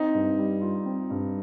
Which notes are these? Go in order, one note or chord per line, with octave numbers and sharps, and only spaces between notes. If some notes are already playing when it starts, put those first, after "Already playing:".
Already playing: C4 D#4
G2
G3
F4
C4
G2